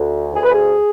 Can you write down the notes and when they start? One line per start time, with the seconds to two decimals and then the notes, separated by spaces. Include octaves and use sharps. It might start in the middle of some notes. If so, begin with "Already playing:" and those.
Already playing: D2
0.34 D2 G#4
0.43 B4
0.52 G#4